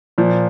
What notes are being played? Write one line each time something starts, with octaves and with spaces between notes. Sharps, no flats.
A#2 F3